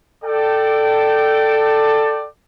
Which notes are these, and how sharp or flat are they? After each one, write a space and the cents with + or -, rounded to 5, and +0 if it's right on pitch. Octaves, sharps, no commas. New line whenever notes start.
A4 +5 D5 +15 G5 -20